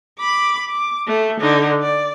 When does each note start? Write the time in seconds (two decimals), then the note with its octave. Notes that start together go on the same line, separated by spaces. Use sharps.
0.19 B5 D6
0.69 D6
1.07 A3
1.40 D3 D#4
1.82 D5